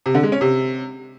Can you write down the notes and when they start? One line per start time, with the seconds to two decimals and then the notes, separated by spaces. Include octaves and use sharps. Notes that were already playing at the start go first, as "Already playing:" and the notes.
0.06 C3
0.14 D3
0.23 G#3
0.32 C#4
0.41 C3